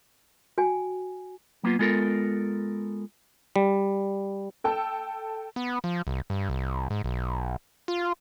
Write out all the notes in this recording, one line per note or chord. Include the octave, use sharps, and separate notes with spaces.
F#4 G5 G#5
F#3 A#3 B3 F4
G#3 B3 F4 A4 A#4
G3
A4 G5 A5 E6
B3
F3
C2
G2
C2
G#2
B1
F4